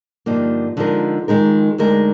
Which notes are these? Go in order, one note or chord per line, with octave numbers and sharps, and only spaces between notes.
G2 D3 F3 A#3 D#4
D3 F3 G#3 D#4 A#4
F2 D#3 G#3 D#4 A#4
D2 D3 G#3 D#4 A#4